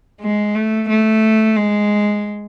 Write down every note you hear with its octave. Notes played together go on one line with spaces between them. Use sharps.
G#3
A3
A3
G#3